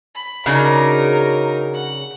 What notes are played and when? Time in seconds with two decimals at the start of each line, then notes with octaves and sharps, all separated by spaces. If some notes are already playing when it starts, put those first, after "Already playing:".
0.15 B5
0.46 C#3 F#3 D4 D#4 A#4
1.74 F#5